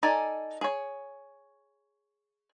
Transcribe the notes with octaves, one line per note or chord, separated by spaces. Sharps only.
D#4 A4 D5 G#5
G#4 C#5